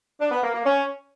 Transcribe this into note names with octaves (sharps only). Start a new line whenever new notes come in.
D4
B3
A#3
A#3
C#4